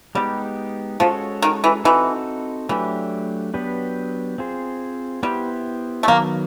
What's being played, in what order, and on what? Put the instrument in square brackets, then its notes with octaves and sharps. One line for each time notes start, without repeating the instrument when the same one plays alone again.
[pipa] G3 [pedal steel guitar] G#3 B3 D#4 G4
[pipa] F3 [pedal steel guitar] G#3 C#4 F#4 A4 C#5
[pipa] D#3
E3
[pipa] E3 [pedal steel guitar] C4 D#4 F#4 A4
[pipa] E3 [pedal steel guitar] F#3 A3 D4 G4
[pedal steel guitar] F#3 B3 D4 G4 B4
C4 F4 G#4 C5
[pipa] G3 [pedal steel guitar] B3 E4 G4 C5
[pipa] A3
[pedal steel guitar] D#3 F#3 B3 [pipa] A#3